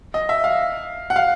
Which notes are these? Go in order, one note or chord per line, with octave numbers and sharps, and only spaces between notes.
D#5
E5
F5
F#5
F5